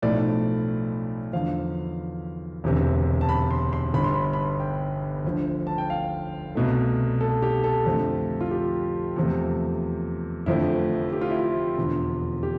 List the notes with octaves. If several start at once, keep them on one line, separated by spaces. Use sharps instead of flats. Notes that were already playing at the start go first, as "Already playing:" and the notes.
B1 A2 F3 A3 D5
E2 D3 F3 F5
E1 D2 C3 E3
A5
B5
C6
C6
G1 G2 D3 B5
C6
B5
C6
B5
G5
D2 D3 F3
A5
G5
F5
C2 B2 A3
A4
G4
A4
F2 D3 F3 A3
F4
G4
E2 C3 F3 A3
F1 F2 D3 F3 A3 E4
G4
F4
E4
F4
E1 E2 D3
G4